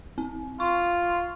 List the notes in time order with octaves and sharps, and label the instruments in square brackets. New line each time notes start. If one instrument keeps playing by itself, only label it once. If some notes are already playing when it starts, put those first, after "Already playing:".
[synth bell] C4
[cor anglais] F4 [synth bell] C#6